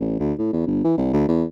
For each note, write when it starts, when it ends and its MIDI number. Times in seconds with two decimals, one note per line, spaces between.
0.01 0.19 33
0.20 0.33 38
0.39 0.50 45
0.53 0.63 40
0.67 0.83 31
0.84 0.93 52
0.98 1.08 36
1.13 1.24 38
1.28 1.44 40